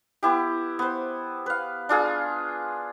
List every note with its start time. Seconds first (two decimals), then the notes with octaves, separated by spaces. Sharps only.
0.23 B3 E4 G4
0.79 B3 C5
1.46 B4 F5
1.89 D4 F4 G#4